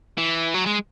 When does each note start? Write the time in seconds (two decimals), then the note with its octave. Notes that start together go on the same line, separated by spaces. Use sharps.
0.18 E3
0.54 F#3
0.66 G#3